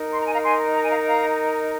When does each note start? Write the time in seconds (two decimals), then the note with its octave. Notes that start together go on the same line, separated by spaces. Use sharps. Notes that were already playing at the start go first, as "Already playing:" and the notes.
Already playing: D#4 A#4
0.12 C6
0.19 A#5
0.26 G#5
0.32 F5 A#5
0.44 G#5 C6
0.74 A#5
0.83 G#5
0.90 F5 A#5
1.06 F5 A#5